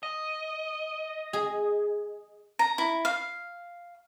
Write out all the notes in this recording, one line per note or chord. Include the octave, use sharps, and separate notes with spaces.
D#5
G#4
A#5
E4
F5